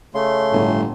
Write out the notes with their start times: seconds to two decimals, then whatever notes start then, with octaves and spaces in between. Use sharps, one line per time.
0.15 C#3 A3 C6
0.53 G1 A2